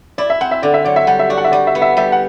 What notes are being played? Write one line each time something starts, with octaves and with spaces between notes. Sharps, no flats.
E4 D5
E5
C4 F#5
E5
D3 D5
E5
F#3 D5
E5
G3 F#5
E5
F#4 D5
F#5
E5
G3 D5
E5
B3
E5
G3 E5
F#5